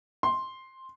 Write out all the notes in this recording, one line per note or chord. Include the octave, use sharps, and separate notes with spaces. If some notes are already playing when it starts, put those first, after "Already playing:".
C6